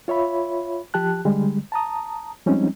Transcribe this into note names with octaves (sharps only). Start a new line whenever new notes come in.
F4 C#5 E5 B5
F3 G4 A5 F#6
D3 G3 G#3
A5 A#5 D#6
F3 G3 G#3 C4 C#4 D#4